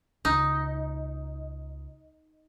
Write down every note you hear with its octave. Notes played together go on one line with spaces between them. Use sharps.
C#2 D#4